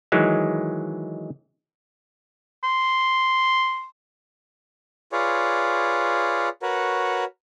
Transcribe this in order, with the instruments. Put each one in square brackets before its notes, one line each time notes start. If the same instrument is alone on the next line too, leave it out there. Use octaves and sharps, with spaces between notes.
[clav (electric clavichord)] D#3 E3 F#3 G#3
[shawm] C6
[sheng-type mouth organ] F4 G#4 B4 C#5 D5
F#4 A#4 B4 C#5